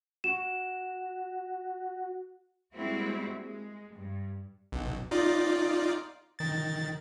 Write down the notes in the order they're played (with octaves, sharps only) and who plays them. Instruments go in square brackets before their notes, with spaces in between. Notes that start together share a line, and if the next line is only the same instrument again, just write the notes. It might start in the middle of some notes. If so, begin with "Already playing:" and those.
[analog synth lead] F#4 [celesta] E7
[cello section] G3 G#3 A#3 C4 E4 F#4
G#3
G2
[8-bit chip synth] B1
D#4 F4 D5
D#3 A6